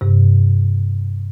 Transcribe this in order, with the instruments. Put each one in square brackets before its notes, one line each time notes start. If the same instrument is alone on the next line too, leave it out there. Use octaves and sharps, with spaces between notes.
[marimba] G2 C3